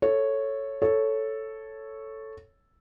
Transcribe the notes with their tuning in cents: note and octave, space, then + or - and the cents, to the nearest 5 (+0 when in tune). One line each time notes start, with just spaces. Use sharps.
A4 +0 C#5 -5
A4 +0 C#5 +0